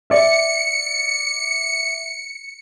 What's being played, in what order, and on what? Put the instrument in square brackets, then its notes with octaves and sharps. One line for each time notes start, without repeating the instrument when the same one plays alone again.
[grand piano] D5 E5 [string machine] C#7